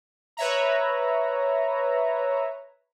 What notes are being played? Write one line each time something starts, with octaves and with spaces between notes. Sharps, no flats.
B4 C#5 E5 A#5